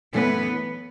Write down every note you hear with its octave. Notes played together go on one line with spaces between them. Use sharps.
F#2 E3 A3 B3 E4 B4